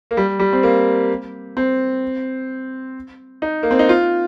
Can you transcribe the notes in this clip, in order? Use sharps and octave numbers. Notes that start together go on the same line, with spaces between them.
A#3
G3
G3
C4
A#3
C4
D#4
A#3
C4
D#4
F4